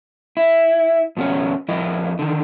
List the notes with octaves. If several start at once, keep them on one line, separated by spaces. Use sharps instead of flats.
E4
F2 B2 F3 C#4 C#5
F2 F3 E4 D#5
D3 D#3